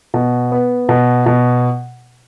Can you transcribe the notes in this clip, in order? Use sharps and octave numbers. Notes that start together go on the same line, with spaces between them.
B2
B3
B2
B2